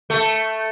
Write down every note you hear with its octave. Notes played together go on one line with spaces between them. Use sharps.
A3